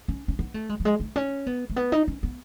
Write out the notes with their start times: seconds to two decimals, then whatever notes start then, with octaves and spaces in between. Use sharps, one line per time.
0.08 C#4
0.28 C#4
0.39 B3
0.54 A3
0.69 G#3
0.80 F#3
0.85 G#3
1.00 A3
1.16 C#4
1.46 B3
1.70 A3
1.76 B3
1.92 D#4
2.08 C#4
2.23 B3